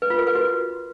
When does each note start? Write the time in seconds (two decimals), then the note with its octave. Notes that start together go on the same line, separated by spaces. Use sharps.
0.02 B4
0.10 F4
0.19 A#4
0.27 B4
0.35 F#4